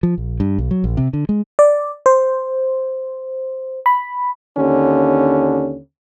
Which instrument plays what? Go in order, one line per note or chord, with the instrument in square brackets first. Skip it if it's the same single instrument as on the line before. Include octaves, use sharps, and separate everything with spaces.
[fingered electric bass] F3
A#1
G2
B1
F#3
A#1
C3
D3
G#3
[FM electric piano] D5
C5
B5
[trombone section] D#2 D3 C#4